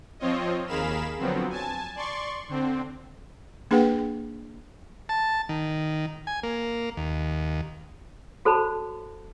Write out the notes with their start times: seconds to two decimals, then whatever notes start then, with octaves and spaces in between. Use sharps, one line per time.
0.19 F3 C4 F4 C#5 D#5
0.67 D#2 G#4 A#4 F5 B5 E7
1.19 D3 F3 F#3 B3 C4
1.50 G#5 A5
1.96 D5 C6 C#6
2.49 D3 C4
3.71 A#3 D4 G#4 B4 F#5 G5
5.09 A5
5.49 D#3
6.27 G#5
6.43 A#3
6.97 D#2
8.45 F#4 A4 C5 C#5 A5 B5